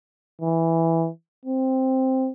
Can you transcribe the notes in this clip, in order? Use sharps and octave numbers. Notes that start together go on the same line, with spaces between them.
E3
C4